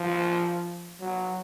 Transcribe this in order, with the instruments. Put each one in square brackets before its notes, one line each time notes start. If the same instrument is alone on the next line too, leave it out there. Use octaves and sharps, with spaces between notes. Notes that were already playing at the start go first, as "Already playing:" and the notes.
Already playing: [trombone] F3
F#3